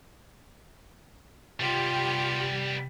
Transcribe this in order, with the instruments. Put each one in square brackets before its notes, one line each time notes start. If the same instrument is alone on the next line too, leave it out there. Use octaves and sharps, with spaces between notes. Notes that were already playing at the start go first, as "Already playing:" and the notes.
[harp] C3 [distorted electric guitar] G3 B3 [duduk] F4 [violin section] G4